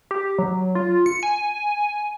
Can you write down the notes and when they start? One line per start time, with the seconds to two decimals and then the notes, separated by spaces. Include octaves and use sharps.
0.11 G4
0.38 F#3
0.75 F4
1.06 C#7
1.23 G#5